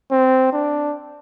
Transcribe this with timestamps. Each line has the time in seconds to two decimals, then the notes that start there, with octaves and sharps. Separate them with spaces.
0.11 C4
0.52 D4